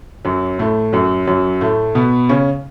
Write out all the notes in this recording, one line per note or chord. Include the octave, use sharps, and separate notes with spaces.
F#2 F#3
A2 A3
F#2 F#3
F#2 F#3
A2 A3
B2 B3
C#3 C#4